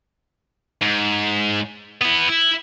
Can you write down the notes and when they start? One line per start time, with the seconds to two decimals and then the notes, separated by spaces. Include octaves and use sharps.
0.82 G#2
2.01 B3 E4
2.28 E4